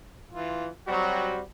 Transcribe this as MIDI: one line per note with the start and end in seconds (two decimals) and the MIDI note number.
0.31 0.68 52
0.31 0.68 65
0.88 1.32 54
0.88 1.41 55
0.88 1.41 60
0.88 1.41 66